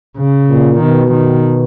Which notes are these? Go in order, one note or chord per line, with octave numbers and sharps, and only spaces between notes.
C#3
A#2
B2 D#3
D#3